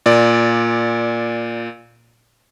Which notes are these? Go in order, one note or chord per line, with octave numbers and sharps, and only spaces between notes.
A#2 D5